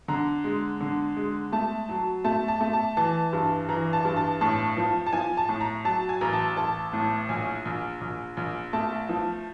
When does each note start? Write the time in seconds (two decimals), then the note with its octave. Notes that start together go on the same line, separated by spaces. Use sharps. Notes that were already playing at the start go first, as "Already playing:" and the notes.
0.08 D3 A#5
0.44 G#3
0.81 D3
1.17 G#3
1.52 A3 A5
1.89 F#3
2.24 A3 A5
2.48 A5
2.61 A3
2.73 A5
2.97 E3 A5
3.33 G2
3.69 E3 A#5
3.93 A5
4.05 G2
4.17 A5
4.41 A2 A5
4.77 F3
5.06 A5
5.13 F3 G#5
5.37 A5
5.49 A2
5.60 A#5
5.85 F#3 A5
6.09 G#5
6.21 A1 A#5
6.33 A5
6.57 A1 A5
6.93 A2
7.29 A#1 G#5
7.65 A#1
8.01 A#1
8.37 A#1
8.73 A3 A5
9.09 F3